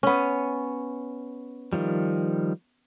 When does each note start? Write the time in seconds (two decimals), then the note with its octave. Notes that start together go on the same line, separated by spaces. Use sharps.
0.03 B3 C#4
1.73 D#3 F3 G3